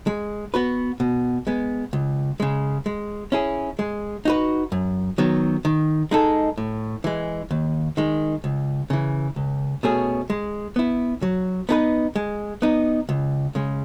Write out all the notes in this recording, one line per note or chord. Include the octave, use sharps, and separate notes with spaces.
G#3
B3 F#4 B4
B2
G#3 B3
C#2
C#3 G#3
G#3
C#4 E4 G#4
G#3
D#4 F#4 B4
F#2
D#3 F#3 B3
D#3
G#3 D#4 A4
A2
E3 G#3
D#2
D#3 G#3
C#2
C#3 E3
C#2
B2 A3 C#4 G#4
G#3
B3 E4
F#3
B3 D#4 G#4 B4
G#3
B3 D#4
C#2
C#3 G#3